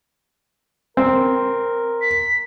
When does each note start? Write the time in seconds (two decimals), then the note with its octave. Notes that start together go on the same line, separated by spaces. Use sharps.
0.97 C4 A#4
2.02 B6